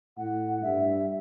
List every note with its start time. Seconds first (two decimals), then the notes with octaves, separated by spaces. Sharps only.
0.18 A2 F#5
0.62 G2 E5